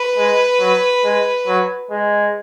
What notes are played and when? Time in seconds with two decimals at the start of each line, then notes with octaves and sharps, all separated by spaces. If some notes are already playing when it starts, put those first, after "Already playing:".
Already playing: B4
0.17 G#3
0.60 F#3
1.04 G#3
1.48 F#3
1.91 G#3